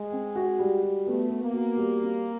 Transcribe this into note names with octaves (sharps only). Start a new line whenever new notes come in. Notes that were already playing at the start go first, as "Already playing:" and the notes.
Already playing: G#3
C4
F#4
G3
F#4
A3 B3
B3
A#3
F#4
G3
C4